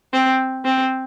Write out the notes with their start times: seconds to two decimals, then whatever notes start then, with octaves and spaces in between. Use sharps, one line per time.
0.13 C4
0.65 C4